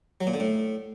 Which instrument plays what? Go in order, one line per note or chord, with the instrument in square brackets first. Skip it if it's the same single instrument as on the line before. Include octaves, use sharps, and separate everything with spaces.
[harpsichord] F#3
A#2
D3
A2